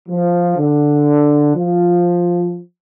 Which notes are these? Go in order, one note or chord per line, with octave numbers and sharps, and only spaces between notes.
F3
D3
F3